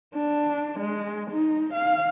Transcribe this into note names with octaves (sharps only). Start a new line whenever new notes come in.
D4
G#3
D#4
F5